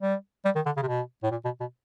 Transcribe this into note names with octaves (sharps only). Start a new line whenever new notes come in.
G3
G3
D#3
D3
C#3
C3
B2
A2
A#2
B2
B2